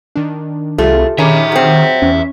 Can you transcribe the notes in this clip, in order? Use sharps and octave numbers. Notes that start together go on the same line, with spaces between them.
D#3 D4
C2 A3 F4 G4 G#4
D#3 C#4 G#4 E5 A#5 B5 D6
F#3 C4
E2 C#4